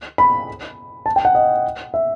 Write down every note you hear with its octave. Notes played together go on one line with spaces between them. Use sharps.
B5
A5
G5
F#5
D#5
E5